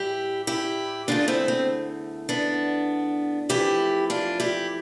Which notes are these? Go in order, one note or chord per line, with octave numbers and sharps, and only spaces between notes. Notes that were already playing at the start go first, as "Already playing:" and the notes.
Already playing: A2 E3 G3 E4 G4
E4 G4
E2 D3 A3 D4 F4
C4 E4
C4
B3 D4
F2 E3 A3 E4 G4
D4 F4
E4 G4